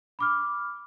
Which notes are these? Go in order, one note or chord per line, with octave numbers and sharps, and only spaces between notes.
B5 D6 F6